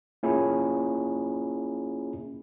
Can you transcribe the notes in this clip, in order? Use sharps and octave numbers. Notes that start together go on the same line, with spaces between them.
A#3 C#4 E4 F4 G#4